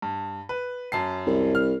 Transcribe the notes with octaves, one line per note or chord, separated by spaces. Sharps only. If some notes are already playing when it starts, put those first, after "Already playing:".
G2
B4
F#2 A5 C7
C2
F6